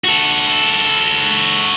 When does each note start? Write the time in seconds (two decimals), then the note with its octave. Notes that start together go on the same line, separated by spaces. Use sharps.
0.04 F#4 A4